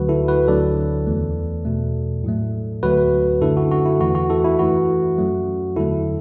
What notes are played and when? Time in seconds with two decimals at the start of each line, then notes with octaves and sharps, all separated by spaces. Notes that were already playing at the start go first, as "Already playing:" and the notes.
Already playing: D2 D3 F#3 F#4 B4
0.09 E4 A4
0.28 F#4 B4
0.48 D2 D3 F#3 A4 D5
1.07 E2 E3 A3
1.65 E2 B2 A3
2.24 A2 F#3 A3
2.83 D2 D3 F#3 A3 F#4 B4
3.41 F#2 D3 A3 E4 A4
3.57 F#4
3.71 F#4
3.86 E4
4.00 E2 E3 A3 F#4
4.15 F#4
4.30 E4 A4
4.44 E4
4.59 F#2 E3 A3 F#4
5.18 F#2 F#3 A3
5.76 E2 D3 F#3 A3 E4 A4